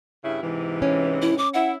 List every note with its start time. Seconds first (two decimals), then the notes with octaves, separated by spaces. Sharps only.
0.24 G2 C#3 E4
0.41 G#2 C3 E3
0.82 C#4
1.22 E4
1.38 D6
1.54 E4 F#5